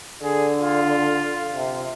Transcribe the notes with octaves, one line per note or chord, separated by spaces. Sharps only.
D3 G#4
F4
C3